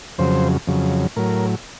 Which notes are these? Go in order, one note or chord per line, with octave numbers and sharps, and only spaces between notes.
F2 C#3 F#3 C5
F2 C#3 F#3
A2 F#3 A#4